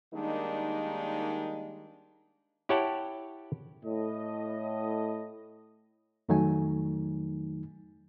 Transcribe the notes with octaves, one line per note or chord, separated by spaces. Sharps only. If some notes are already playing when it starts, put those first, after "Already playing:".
D#3 G3 G#3 A#3 D4 D#4
E4 G4 C#5 F#5 G5 A5
A2 D#5
F2 D#3 F#3 A3 D#4 G#5